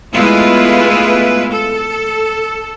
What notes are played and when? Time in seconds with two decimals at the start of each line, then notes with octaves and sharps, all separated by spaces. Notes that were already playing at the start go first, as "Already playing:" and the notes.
0.13 G#3 A3 B3 E4 F4 B4
1.50 A4